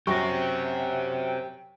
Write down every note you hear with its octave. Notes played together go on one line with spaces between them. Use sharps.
F#2 G4 C5 G5 C#6 A#6